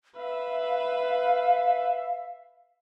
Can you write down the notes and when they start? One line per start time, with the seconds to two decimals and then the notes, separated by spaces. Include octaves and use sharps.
0.17 B4 E5 F5